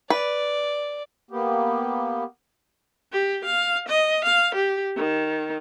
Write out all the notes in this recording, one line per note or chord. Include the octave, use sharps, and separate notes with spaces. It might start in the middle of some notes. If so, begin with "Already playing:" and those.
B4 D5
A#3 B3 G4
G4
F5
D#5
F5
G4
D#3